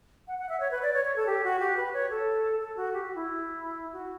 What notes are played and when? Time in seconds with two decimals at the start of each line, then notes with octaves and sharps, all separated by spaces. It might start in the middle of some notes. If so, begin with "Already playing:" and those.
0.28 F#5
0.38 F#5
0.49 E5
0.60 C#5
0.71 B4
0.83 D5
0.93 C#5
1.05 C#5
1.16 A4
1.27 G4
1.44 F#4
1.60 G4
1.77 B4
1.93 C#5
2.10 A4
2.60 A4
2.77 F#4
2.94 G4
3.04 F#4
3.15 E4
3.93 F#4